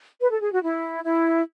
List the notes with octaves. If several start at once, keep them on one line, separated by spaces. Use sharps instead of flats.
B4
A4
G#4
F#4
E4
E4